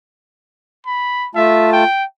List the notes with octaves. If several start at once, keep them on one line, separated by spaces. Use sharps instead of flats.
B5
A3 F4 E5 A5
G5